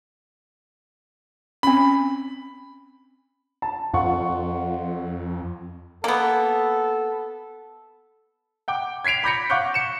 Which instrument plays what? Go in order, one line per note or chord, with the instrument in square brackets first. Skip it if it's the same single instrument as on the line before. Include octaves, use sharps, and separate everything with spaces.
[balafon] C4 C#4 [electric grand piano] B5
[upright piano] A5
[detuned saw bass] F2 [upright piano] F4 F#5 C#6
[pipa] A#3 B3 [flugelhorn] A4
[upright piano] F#5 G5 D6
G#6 B6 C7 D7 F7
B5 D6 G6 A#6 B6 C#7
F5 F#5 C#6 D6 F#6 G6
C#7 E7